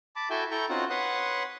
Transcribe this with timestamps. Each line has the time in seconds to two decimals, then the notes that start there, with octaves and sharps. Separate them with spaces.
0.16 A5 B5 D6
0.30 E4 F#4 A4 E5 G5 G#5
0.51 E4 A4 G5 A#5 C#6
0.69 C4 C#4 D#4 F4 F#4 F#5
0.90 B4 C#5 F#5 C6 D#6